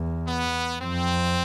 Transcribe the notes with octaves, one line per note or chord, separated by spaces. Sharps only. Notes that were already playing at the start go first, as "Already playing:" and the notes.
Already playing: E2
B3
F2 C4